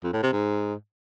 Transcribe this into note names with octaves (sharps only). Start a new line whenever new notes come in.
F2
A2
C3
G#2